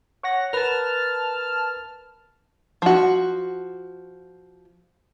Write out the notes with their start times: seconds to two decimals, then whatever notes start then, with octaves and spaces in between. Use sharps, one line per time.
0.23 C#5 F#5 A#6
0.53 A#4 B4 A5 F6
2.82 F3 F#4